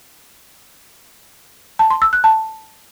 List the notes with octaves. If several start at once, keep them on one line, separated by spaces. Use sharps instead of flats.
A5
C6
E6
F#6
A5